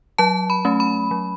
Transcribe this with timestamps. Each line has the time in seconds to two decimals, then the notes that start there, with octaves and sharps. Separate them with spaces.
0.18 F#3 A5
0.50 B5
0.65 A3 C#4
0.80 B5
1.11 F#3